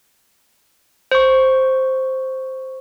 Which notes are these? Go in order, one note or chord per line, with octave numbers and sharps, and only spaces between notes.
C5 C#6